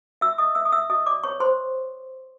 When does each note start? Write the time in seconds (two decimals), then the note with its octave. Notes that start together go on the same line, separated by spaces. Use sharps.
0.21 F#4 E5 E6
0.38 D#5 D#6
0.55 B4 E5 E6
0.65 D#6
0.72 E5 E6
0.89 F#4 D#5 D#6
1.06 D5 D6
1.24 B4 C#5 C#6
1.40 C5 C6